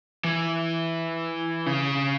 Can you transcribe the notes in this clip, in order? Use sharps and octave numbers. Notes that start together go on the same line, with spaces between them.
E3
C#3